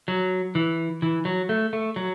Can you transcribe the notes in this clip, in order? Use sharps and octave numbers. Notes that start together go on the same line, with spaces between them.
F#3
E3
E3
F#3
A3
A3
F#3